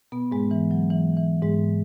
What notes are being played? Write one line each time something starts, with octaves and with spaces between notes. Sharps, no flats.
B2 B3
G#2 G#3
E3
F#3
E3
E3
G#2 G#3